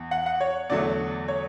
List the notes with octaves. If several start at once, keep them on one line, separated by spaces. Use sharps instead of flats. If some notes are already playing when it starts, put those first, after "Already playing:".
Already playing: E2
F#5
F#5
C#5
E2 D3 F#3 A3 D5
C#5